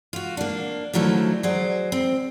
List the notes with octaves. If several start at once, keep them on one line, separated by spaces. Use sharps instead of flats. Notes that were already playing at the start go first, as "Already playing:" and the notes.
F4 F#4
A#3 D4
D3 D#3 F3 F#3 A3 E4
F#3 G#4 C5 D5
C4